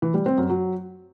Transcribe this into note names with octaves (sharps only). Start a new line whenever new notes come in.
E3
G3
C4
F#2
F#3